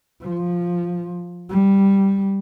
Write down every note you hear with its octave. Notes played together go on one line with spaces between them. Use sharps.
F3
G3